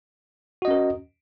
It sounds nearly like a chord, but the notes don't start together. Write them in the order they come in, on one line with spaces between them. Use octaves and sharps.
F#4 D#5 C#4 A#4